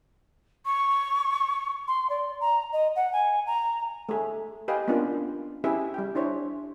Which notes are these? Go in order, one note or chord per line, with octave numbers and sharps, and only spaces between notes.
C#6
C6
D5
A#5
D#5
F#5
G#5
A#5
A3 G#4
G4 B4 D#5 F5 G5 G#5
A#3 B3 C#4 D4 F4
C#4 E4 G4 G#4 B4 E5
G3 G5
D4 E4 C5 C#5